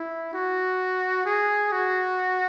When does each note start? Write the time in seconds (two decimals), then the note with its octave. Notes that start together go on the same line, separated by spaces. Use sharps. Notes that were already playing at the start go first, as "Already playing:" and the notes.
Already playing: E4
0.33 F#4
1.25 G#4
1.72 F#4